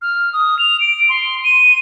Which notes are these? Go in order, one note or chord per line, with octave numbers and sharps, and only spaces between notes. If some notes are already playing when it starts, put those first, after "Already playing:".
F6
D#6
F7
D7
C6
D#7